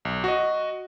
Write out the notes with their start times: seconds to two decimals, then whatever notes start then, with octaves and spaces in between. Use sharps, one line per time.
0.05 B1
0.24 F#4 D#5